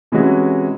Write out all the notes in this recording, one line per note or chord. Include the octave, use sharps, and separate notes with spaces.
C3 E3 G#3 C#4 F#4